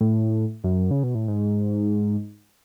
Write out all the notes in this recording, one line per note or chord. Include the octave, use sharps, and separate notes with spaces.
A2
F#2
C#3
B2
A2
G#2